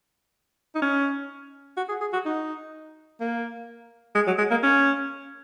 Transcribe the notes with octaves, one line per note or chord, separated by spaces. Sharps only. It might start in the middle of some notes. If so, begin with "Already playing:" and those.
D#4
C#4
F#4
G#4
G#4
F#4
D#4
A#3
G#3
F#3
G#3
A#3
C#4